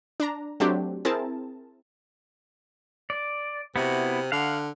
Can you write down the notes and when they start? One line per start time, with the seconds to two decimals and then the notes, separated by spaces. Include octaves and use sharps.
0.20 D4 A#5
0.60 F#3 A3 C4 D4 G4
1.05 C4 E4 G#4 A#4 A5
3.10 D5
3.76 C3 B3 E4 F#4
4.32 D3 F5 F#5